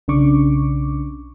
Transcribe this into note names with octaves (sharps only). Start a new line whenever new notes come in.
B1 C#3 D4 C#6 D6